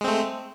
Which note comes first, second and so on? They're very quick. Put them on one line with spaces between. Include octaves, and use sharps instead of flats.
G#3 C4 A3